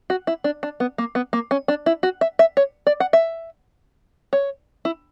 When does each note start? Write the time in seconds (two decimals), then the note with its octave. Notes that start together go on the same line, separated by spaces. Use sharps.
0.10 F#4
0.27 E4
0.44 D4
0.63 D4
0.80 B3
0.98 A#3
1.15 B3
1.33 A#3
1.51 C#4
1.68 D4
1.86 E4
2.03 F#4
2.21 E5
2.39 E5
2.57 C#5
2.87 D5
3.00 F#5
3.13 E5
4.33 C#5
4.85 E4